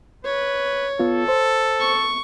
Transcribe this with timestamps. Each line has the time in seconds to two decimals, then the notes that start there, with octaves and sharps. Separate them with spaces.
0.25 B4 C#5
0.99 B3 F4 A4
1.28 C5
1.80 C#6